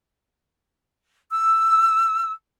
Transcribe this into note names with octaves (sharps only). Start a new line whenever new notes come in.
E6